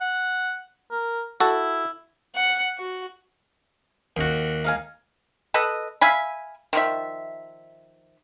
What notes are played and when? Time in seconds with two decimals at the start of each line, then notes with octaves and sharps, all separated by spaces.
0.01 F#5
0.91 A#4
1.40 E4 F#4 A4
2.36 F#5
2.79 F#4
4.17 D#2 F#4
4.64 D#4 F5 G#5
5.54 A4 B4 D#5
6.01 E5 F5 G#5 B5
6.73 D#3 F3 E5